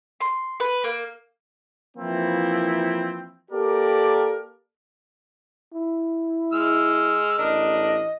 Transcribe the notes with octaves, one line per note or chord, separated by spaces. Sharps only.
C6
B4
A#3
E3 F3 A#3 C4 E4
A#3 G4 A4 A#4 D5
E4
G#3 E6 F6
A1 D4 A#4 D#5